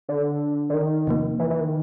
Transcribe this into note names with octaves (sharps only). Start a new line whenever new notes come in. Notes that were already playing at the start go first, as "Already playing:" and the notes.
D3
D3
D#3
E2 C3 F3 A#3
E3
E3
D#3